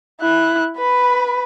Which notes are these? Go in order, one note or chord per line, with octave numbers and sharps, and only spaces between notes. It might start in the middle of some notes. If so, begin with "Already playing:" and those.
E4 F#6
B4 B5